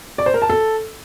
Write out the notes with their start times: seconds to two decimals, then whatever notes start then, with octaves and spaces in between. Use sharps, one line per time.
0.18 D5
0.26 C5
0.34 A#4
0.42 A5
0.50 A4